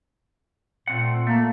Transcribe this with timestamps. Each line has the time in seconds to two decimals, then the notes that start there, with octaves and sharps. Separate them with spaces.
0.87 A#2 A3 C4 F#5
1.27 A3 A#3